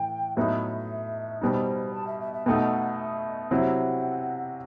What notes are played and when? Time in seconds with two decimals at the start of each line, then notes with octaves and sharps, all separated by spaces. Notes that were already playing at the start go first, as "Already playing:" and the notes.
Already playing: A2 E3 G5
0.36 A2 F#3 B3 D#4 E5
1.41 B2 G3 D#4 C5
1.93 A5
2.07 E5
2.20 E5
2.33 E5
2.46 B2 A3 D#4 F#5 G5
2.99 E5
3.51 C3 F#3 C4 E4 F#5